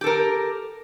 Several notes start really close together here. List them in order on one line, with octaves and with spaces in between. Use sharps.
G4 A4 A#4